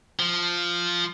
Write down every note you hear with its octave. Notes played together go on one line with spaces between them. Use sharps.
F3